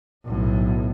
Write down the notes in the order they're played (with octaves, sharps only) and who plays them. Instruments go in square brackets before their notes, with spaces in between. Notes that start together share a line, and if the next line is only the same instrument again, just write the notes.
[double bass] B1 A2